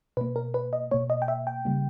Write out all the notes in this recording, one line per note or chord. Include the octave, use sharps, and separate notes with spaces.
B2 A#3 B4
A#4
B4
D#5
B2 A#3 C#5
D#5
G5
E5
G5
C#3 G3 A#3